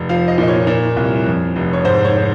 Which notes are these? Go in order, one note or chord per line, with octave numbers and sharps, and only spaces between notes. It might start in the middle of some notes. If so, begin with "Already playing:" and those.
Already playing: F1
F3 F5
D#5
A#2 D#5
C#5
A#2
C2
F2
F1
C#5
G#2 C5
C#5